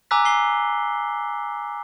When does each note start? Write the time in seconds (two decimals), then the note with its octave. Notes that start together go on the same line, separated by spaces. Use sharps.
0.11 G#5 A#5 D6 E6 F#6 B6
0.25 G#5 C7 G7